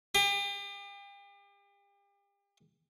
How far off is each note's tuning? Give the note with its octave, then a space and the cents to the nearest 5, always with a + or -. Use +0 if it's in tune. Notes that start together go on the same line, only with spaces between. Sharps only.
G4 +40